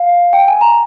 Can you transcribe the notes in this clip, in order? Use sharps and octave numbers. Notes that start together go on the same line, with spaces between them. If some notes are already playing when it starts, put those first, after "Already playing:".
Already playing: F5
G5
G#5
A#5